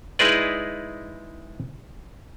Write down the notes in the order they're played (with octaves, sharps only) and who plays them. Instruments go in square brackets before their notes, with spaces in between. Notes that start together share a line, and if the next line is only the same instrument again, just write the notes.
[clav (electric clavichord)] G#3 D#4 E4 G#4 B4 D5